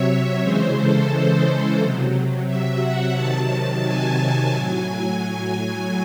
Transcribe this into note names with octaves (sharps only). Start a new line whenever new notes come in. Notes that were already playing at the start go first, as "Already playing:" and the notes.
Already playing: C3 F#3 C#5 E5
C#3 E3 G#3 C5
A4
C3 F#3
E5
F#5
C3 D#3 F#3 A5
G#5
A2 F#3